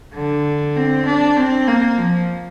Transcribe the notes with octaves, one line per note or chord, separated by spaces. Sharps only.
D3
C4
D4
C4
A#3
F3